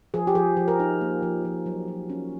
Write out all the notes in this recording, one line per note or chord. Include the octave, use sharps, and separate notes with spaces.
F3 G#4
G4
F3 G#4
F3
A#4
D#4
A#3
F3
F3
F#3
F#3
C#4